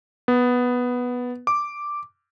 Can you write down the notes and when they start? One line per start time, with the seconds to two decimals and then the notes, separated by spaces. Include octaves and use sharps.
0.28 B3
1.47 D6